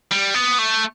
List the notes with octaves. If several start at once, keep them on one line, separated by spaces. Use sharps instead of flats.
G3
B3
A3